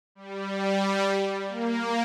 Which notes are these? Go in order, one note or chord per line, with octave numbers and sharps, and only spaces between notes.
G3
G3
A#3